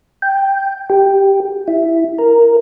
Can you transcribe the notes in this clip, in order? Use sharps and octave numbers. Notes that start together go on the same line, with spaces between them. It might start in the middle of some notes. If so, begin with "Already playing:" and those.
G5
G4
E4
A#4